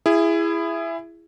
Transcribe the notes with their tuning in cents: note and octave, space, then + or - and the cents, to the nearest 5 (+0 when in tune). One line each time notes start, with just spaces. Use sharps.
E4 +15 G#4 -15